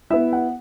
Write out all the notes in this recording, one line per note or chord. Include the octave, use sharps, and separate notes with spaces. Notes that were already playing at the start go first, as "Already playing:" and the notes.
B3 E4 E5
F#5